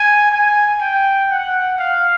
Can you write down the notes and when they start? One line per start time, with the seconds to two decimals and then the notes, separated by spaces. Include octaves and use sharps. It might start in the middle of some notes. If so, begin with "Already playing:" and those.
Already playing: G#5
0.31 G#5
0.80 G5
1.29 F#5
1.78 F5